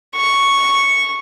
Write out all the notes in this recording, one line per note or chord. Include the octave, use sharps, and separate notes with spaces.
C#6